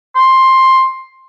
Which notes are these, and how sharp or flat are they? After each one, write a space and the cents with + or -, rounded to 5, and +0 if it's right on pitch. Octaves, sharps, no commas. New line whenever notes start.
C6 +10